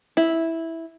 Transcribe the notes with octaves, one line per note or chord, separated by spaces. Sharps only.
E4